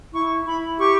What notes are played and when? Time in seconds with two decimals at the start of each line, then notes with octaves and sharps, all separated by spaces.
0.13 E4 C#6
0.46 E4 B5
0.78 G4 C#6